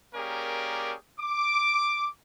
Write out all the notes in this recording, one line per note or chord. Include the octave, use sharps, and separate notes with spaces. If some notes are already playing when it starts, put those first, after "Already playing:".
A#3 C#4 G4 G#4 A#4 D5
D6